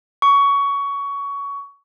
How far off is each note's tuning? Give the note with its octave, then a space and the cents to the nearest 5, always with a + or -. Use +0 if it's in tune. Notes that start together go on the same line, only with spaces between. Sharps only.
C#6 +20